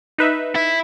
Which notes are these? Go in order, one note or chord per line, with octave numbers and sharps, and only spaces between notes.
D#4 B4 E5
E4